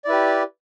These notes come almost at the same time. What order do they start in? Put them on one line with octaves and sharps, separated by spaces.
D5 E4 B4 G4